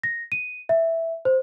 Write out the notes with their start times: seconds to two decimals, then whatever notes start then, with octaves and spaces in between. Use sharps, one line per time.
0.03 A#6
0.32 D#7
0.69 E5
1.25 C5